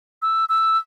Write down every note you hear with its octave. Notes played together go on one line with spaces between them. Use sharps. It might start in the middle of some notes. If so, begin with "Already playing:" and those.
E6
E6